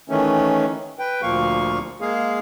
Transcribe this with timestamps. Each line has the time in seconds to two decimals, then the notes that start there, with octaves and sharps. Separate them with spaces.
0.09 D#3 E3 A3 C#4
0.99 B4 G5
1.22 D2 A#2 F3 A#3 F5 C#6
2.01 G#3 A#3 G#4 F5